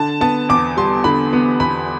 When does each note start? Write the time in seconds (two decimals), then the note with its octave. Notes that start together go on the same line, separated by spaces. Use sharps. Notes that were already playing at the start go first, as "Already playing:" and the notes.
Already playing: D3 A5
0.21 B3 A5
0.49 E2 D6
0.77 G3 C6
1.04 D3 B5
1.33 B3
1.60 E2 B5